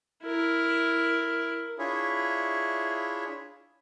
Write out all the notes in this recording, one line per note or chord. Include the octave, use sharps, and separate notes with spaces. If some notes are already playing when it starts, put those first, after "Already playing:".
E4 A#4
D4 E4 F4 G#4 C#5 E5